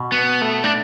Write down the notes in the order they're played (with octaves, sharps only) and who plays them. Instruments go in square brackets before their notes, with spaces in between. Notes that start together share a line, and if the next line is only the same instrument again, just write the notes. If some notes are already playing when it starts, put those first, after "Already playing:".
Already playing: [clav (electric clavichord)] B2
[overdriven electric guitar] B3
A3
D4